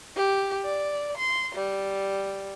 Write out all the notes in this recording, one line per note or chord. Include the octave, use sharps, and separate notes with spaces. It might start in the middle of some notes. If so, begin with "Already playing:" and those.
G4
D5
C6
G3